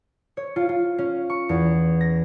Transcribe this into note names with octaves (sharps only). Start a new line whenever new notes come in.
C#5
F4
F4
C#4
C#6
E2
A#6